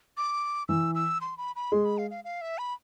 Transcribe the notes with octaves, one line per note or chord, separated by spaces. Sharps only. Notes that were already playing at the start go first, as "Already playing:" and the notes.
D6
E3 E6
E6
C6
B5
B5
G#3 C6
B5
F5
F5
F5
E5
B5